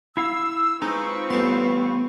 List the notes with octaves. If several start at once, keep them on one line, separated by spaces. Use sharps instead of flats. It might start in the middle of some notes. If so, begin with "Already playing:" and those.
E4 F5 E6
G#3 C4 D#4 F4 B4 C#6
A1 G3 B3 C6